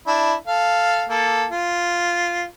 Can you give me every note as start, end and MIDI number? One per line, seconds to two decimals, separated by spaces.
0.07 0.34 62
0.07 0.34 64
0.47 1.04 69
0.47 1.04 77
1.10 1.45 58
1.10 1.45 69
1.50 2.44 65